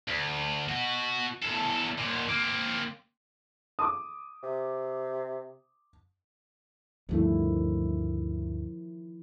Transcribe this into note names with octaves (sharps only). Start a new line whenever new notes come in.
D2
B2 F#4
E2 A4
D#2 A#2
A#3 C4
D6 D#6
C3
D2 G2 D#3 F3 A3 E4